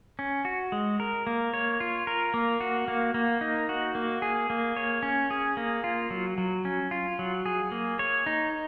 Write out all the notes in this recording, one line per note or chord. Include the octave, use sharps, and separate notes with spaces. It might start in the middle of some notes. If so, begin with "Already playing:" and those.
C#4
F#4
G#3
A#4
A#3
C#5
F4
A#4
A#3
F#4
A#3
A#3
D#4
F#4
A#3
G#4
A#3
C#5
C#4
G#4
A#3
F4
F#3
F#3
C#4
F4
F#3
G#4
A#3
C#5
D#4